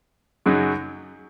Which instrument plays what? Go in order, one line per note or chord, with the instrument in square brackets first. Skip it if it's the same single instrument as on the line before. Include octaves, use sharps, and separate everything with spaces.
[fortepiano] F#2 C#3 F#3 D#4